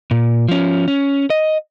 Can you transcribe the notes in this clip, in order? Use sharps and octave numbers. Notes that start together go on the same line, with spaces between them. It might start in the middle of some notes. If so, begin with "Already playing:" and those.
A#2
F3 C#4
C#4
D#5